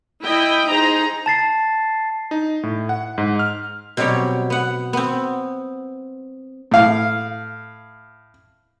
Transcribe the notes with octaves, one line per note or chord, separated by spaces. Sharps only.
E4 D#5 G5
D#4 G#4 C5 A#5
A5 A6 C7
D#4
A2
F#5
G#2
F6
B2 F#3 G3 C4 G4 C#5
B3 F#5
B3 C4
A2 F5